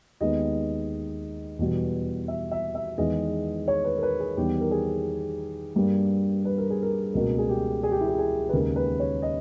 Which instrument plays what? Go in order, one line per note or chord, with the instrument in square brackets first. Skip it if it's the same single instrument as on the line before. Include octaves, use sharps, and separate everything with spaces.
[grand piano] D#2 D#3 G#3 B3 D#5
E2 B2 G3 B3
E5
E5
E5
E2 D#3 G#3 B3 D#5
C#5
B4
A#4
B4
G#4
E2 D#3 G3 B3 G4
A#4
G#4
G2 G3 A#3
B4
A#4
G#4
A#4
C#2 B2 A#3 A#4
G#4
G4
G#4
G4
E4
G4
G#4
B4
D#2 C#3 G#3 A#4
B4
C#5
D#5